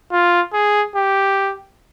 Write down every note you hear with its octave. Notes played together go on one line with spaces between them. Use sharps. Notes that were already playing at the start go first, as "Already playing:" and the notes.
F4
G#4
G4